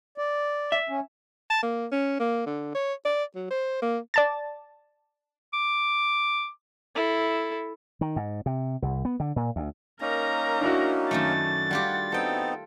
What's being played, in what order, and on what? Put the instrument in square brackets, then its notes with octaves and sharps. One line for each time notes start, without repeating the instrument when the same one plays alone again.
[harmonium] D5
[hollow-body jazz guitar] E5
[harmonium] C#4
[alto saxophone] A5
A#3
C#4
A#3
D3
C#5
D5
F#3
C5
A#3
[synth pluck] D5 A5 A6
[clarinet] D6
[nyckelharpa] E4 A4
[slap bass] D#3
G#2
C3
C2
B3
D3
A#2
D2
[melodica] A#3 C#4 D#4 [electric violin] A#4 A#5
[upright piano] D4 E4 F#4
[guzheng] F#2 D#3 A3 [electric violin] A6
[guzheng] G3 F4 G4 [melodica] F#5
[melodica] B3 C4 D#4 [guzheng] A4 G5